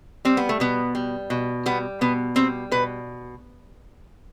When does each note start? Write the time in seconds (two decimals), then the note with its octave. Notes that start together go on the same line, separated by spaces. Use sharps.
0.25 G3 C4
0.37 B3
0.49 A3
0.60 B2 B3
0.95 G3
1.30 B2
1.66 G3 B3
2.01 B2 B3
2.36 G3 C4
2.71 B2 B4